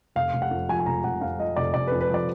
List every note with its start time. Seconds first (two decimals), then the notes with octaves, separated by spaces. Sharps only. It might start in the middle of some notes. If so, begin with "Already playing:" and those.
0.15 F1 F5
0.33 F1
0.42 F#5
0.51 F2
0.69 F3 G#5
0.79 G#5
0.86 F1 A#5
1.04 F1 F#5
1.21 F2 F5
1.39 F3 D#5
1.56 F1 D5
1.74 F1 D5
1.87 B4
1.92 F2
2.00 B4
2.10 F3 D5